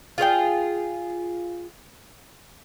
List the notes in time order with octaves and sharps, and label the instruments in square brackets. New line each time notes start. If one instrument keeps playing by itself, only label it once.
[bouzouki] F4 G#4 C5 G5